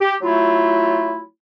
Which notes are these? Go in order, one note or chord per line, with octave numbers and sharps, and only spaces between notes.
G4
F#3 A3 E4 F4